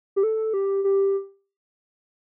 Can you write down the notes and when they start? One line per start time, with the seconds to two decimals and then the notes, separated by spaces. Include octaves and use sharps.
0.16 G4
0.23 A4
0.54 G4
0.84 G4